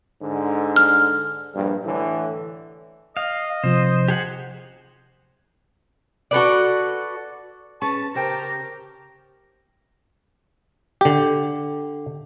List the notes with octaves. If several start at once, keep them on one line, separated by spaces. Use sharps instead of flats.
G#2 D3
F6
A#1 G2
A2 D3 E3
D#5 F5
C3 F3 C5
G4 G#4 F#5
F#4 A4 B4 D5
C#4 G#4 B4 A5 C#6
C#3 G4 A#4 C5 G5 A#5
D3 G4